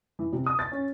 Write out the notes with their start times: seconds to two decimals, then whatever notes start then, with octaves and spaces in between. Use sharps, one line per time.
0.19 E3
0.33 C3
0.46 D#6
0.59 A6
0.72 C#4